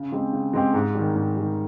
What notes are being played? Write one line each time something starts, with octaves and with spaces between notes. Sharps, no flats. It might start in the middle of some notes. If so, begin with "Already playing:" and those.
Already playing: C#3
G#3 C4 G4
C#3
G#3 C4 G4
G#2
D#3 G3
G#2
D#3 G3